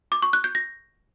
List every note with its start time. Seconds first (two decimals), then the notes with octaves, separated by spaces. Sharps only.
0.12 D6
0.22 C#6
0.33 F#6
0.44 G6
0.55 A#6